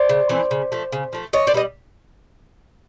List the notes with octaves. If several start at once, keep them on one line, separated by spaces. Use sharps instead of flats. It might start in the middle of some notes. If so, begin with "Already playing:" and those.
Already playing: C5 D5
C#3
E3 A3 C4
C#3
F3 A3
C#3
F3 A3
E3 C#5 D#5
C5 D5
G3 B3 D#4 D#5